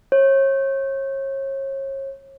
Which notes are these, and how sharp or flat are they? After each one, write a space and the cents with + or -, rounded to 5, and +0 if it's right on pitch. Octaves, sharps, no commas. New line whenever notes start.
C#5 -35